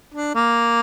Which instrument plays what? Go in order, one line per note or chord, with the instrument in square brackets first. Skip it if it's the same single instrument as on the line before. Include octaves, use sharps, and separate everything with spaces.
[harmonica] D4
A#3